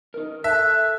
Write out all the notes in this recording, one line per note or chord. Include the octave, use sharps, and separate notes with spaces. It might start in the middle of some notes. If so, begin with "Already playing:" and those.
D#4 A#4
A4 E5 A5 F#6